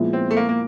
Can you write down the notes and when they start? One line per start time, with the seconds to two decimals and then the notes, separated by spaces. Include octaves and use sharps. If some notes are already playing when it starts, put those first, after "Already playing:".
Already playing: A#2 F3 G#3 B3 E4
0.13 C4
0.31 A3
0.37 A#3
0.49 A#3